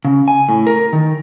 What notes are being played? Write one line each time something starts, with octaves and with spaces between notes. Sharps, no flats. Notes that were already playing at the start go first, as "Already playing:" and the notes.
C#3
G#5
A2
A#4
D#3